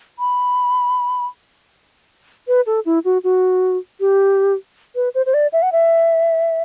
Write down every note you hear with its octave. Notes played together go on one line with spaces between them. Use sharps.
B5
B4
A4
E4
F#4
F#4
G4
B4
C5
C5
D5
E5
F#5
E5